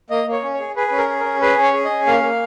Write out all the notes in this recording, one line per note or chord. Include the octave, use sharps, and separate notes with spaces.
A#3 D#5
A#3 C#5
C#4
C#5
G#4
G#4 B4
C#4 B4
A#4
G#4
C#4 A#4
G#4 B4
C#4
C#5
G#4
D#5
C#4
A#3 F5
A#3